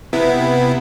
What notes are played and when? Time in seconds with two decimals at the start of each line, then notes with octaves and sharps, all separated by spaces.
0.13 C3 B3 E4